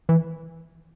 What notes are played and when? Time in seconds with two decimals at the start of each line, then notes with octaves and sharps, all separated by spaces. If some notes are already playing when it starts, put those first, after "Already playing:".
0.09 E3